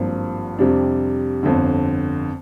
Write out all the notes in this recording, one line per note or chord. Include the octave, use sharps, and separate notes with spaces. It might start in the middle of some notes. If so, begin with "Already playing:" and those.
Already playing: G#1 G2 F3 A#3
F2 C3 G3 D4
G1 F2 D3